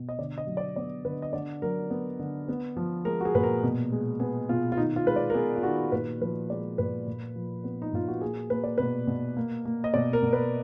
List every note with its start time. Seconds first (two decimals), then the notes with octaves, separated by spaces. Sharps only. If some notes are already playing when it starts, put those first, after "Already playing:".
Already playing: B2
0.09 D#5
0.18 D3 D5
0.38 D#5
0.47 F#3
0.57 D5
0.76 B3 D5
1.05 D3 B4
1.22 D#5
1.33 D3 D5
1.62 F#3 A#4
1.90 B3
2.19 D3
2.48 B3
2.77 F3
3.05 G#3 A#4
3.21 F#4
3.25 G#4
3.35 A#2 B4
3.43 A#4
3.63 B2
3.92 G#3
4.20 B3 G#4
4.49 B2 F4
4.72 F4
4.77 D#3 D#4
4.96 F4
5.06 G#3 B4
5.16 D5
5.30 A#4
5.34 B3 G#4
5.56 F4
5.63 D#3 F#4
5.92 A#2 B4
6.21 F3 B4
6.50 G#3 D5
6.78 A#2 B4
7.07 A#2
7.36 F3
7.64 B3
7.82 D#4
7.93 A#2 F4
8.08 F#4
8.21 A#3 G#4
8.50 A#3 B4
8.64 D5
8.78 B2 B4
9.07 B2
9.37 A#3
9.65 A#3
9.84 D#5
9.94 B2 D5
10.13 A#4
10.23 B2
10.33 B4